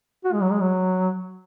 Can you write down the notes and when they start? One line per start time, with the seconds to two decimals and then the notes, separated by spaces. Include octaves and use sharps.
0.25 F#4
0.33 G#3
0.42 F#3
0.51 G#3
0.61 F#3